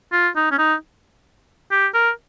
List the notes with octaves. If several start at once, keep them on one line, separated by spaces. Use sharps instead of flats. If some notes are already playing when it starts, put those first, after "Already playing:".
F4
D#4
C#4
D#4
G4
A#4